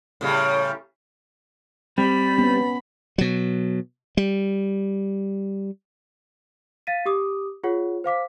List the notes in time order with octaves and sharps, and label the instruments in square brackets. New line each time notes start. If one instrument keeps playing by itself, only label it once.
[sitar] A2 C#3 G3
[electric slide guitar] G3 [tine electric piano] C4 [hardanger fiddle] B5
[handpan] B3 C#4
[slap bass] B2 F#3
G3
[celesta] F5 A6 B6 D#7
G4 D6 D#6
F4 G#4 C#5 F#5
C5 F5 D6 B6